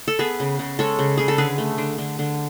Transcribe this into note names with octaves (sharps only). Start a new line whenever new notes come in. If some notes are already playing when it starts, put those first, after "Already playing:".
A4
B3 G#4 B4
C#3
C#3
G#3 A4 C#5
C#3
C#3 G#4
A4
D3 G#4 B4
A3
D3
D3
D3